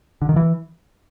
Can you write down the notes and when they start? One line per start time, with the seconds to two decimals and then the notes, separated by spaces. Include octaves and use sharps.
0.22 D3
0.29 D#3
0.36 E3